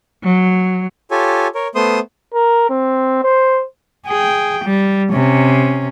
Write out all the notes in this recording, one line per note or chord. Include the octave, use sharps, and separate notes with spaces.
F#3
F4 G4 A4 C#5 G#5
A#4 C#5
A3 B3 C5 C6 D#6
A#4
C4
C5
G#4 G5
G3
C3 C#4